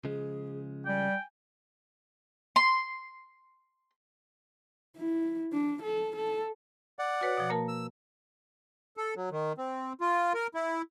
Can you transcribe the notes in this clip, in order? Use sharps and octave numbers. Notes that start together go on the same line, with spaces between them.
C#3 F3 G#3 G#4
G3 G5 G#5
C6
E4
D4
A4
A4
D5 F#5
F#4 B4 C#5
B2 F3
A#3 A#4 A5
E6
A4
F#3
D#3
C4
F4
A#4
E4